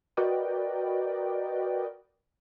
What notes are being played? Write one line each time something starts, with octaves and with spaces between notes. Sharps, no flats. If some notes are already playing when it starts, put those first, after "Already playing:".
F#4 A#4 B4 D5 D#5 G5